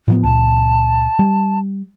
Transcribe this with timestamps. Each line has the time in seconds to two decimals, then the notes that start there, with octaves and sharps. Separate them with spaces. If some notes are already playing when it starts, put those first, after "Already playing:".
0.08 A2 F3 B3
0.24 C#2 A#2 A5
1.19 G3